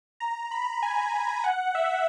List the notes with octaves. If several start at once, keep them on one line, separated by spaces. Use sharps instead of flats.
A#5
B5
G#5
F#5
E5